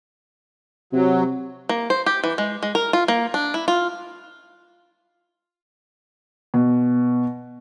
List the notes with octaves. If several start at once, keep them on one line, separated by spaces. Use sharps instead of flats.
C3 F#3
A#3
C5
G4
E3
G#3
G#3
A#4
F4
A#3
D4
E4
F4
B2